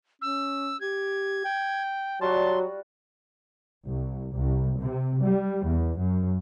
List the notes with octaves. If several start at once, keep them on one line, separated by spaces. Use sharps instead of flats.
C#4 E6
G4 G#6
G5
F#3 G3 F4 F#4 A5 C6
C2
C2
C3
G3
E2
F#2